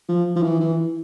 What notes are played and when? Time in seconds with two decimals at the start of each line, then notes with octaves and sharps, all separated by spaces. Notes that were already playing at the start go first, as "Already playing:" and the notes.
0.09 F3
0.36 F3
0.43 E3
0.60 E3